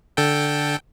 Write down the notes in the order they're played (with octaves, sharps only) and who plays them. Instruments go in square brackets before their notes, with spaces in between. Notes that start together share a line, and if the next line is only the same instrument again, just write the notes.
[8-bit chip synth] D3 A4 G5